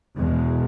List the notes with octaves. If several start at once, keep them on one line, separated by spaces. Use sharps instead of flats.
E2 B2 G#3